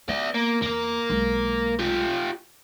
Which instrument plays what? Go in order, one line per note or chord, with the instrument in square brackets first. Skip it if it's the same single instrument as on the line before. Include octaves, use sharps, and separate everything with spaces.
[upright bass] B3 [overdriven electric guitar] D5 E5
[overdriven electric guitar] A#3
[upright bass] E2 [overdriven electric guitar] A#3 A#4
[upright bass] B1 G#3
[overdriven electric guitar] F4 G4